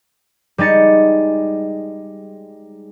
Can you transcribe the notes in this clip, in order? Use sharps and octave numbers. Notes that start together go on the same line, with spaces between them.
G3 G#3 D#4 A6 C#7